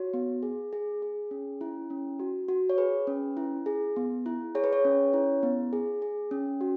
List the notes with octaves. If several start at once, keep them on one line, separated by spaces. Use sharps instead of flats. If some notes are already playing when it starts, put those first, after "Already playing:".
Already playing: F#4 C#5
B3
G#4
G#4
G#4
C#4
E4
C#4
F#4
F#4
C#5
G#4 B4
C#4
E4
G#4
B3
E4
G#4 C#5
B4
C#5
C#4
E4
B3
G#4
G#4
C#4
F#4